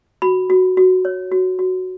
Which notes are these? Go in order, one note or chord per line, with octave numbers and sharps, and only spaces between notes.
F#4 B5
F#4
F#4
C#5
F#4
F#4